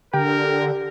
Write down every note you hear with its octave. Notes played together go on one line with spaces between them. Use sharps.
D3 G4 A#4 G5